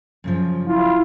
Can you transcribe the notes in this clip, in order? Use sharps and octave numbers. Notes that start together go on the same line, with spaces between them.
F#2 C#3 F3
E4 F4